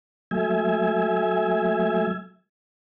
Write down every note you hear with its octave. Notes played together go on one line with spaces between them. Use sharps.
F#3 A3 E5 G#5